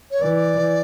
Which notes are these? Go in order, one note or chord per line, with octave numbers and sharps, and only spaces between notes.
C#5
E3 D5